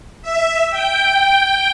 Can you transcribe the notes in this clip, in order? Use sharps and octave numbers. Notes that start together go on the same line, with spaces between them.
E5
G5